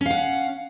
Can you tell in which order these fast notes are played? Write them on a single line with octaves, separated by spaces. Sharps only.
C#4 F5 F#5